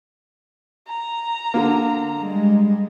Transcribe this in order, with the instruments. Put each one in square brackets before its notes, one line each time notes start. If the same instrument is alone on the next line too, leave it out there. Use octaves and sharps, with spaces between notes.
[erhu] A#5
[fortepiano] D3 A#3
[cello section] G3 G#3